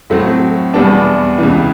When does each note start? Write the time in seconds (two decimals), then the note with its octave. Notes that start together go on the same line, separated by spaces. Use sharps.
0.10 A2 F#3 A3 C4
0.74 E2 B2 G3 B3 D4
1.38 C#2 C#3 E3